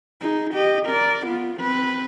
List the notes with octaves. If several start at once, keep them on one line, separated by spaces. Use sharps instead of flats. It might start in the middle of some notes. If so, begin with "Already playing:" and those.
D#4 G#4
G4 D#5
A#4 D5
B3 F4
C4 B4